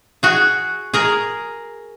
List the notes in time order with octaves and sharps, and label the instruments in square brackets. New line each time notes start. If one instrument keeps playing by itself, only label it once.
[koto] F#4 G#4
G#4 A#4